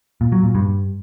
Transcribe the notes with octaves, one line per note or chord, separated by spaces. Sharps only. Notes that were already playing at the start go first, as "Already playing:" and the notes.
A#2
F#3
A#2
G2